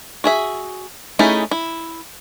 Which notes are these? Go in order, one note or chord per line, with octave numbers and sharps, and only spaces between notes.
F#4 G#4 E5
A3 C#4 D#4 E4 G#4
E4